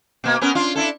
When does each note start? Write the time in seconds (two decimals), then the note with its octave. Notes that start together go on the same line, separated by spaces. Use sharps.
0.24 B2 A#3
0.41 B3 C#4 A#4
0.55 D4 F4
0.75 D4 E4 A4